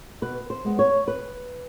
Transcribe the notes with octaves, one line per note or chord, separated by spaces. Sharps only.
B2 B4
C5
G#3 B3
C#5
B4